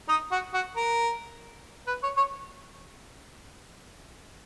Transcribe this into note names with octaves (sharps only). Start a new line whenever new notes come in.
D#4
F#4
F#4
A#4
B4
C#5
C#5